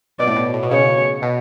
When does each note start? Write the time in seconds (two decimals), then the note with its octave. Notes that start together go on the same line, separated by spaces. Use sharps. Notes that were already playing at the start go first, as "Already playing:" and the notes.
0.19 B2 D5
0.27 A2
0.36 B2
0.54 A2
0.63 B2
0.71 C#3 C#5
1.22 B2